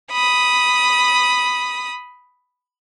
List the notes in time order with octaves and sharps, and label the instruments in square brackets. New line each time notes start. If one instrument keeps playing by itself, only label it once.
[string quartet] B5 D#6